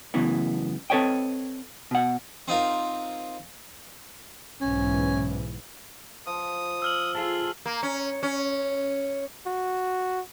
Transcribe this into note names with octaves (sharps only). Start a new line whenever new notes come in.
F#2 A2 C#3 E3 B3
C4 A4 B4 C#5 D#5 G5
B2 F#5
C4 D#4 F4 A#4
B1 G#2 E3 C#4
F3 D#6
E6 F6 F#7
F4 G#4 A4
A#3
C#4
C#4
F#4